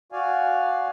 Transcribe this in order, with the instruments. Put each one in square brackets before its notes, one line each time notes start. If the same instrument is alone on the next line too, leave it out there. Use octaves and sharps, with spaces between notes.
[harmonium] F#4 D5 F5 G#5